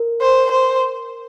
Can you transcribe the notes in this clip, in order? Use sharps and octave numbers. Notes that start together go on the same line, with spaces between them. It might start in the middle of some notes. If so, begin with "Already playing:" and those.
Already playing: A#4
C5
C5